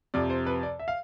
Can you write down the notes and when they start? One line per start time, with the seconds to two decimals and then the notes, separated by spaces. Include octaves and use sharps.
0.14 F2 C3 F3 D5
0.30 C5
0.46 B4
0.63 D5
0.79 E5
0.88 F5